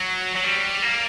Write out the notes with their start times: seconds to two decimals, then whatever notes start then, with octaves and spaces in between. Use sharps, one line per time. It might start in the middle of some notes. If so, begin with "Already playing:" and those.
Already playing: F#3
0.36 F#3
0.44 G3
0.82 A#3